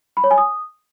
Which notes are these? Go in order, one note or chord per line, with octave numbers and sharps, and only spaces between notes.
B5
C#5
G#5
D#6